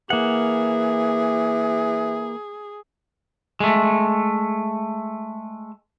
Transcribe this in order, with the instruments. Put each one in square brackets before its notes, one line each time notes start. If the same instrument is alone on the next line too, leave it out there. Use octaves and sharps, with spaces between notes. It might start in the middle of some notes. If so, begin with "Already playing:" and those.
[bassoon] E3 [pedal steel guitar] A#3 F#5 [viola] G#4
[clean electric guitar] G#3 A3